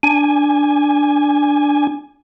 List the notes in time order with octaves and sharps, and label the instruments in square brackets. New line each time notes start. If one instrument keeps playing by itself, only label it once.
[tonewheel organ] D4 G#5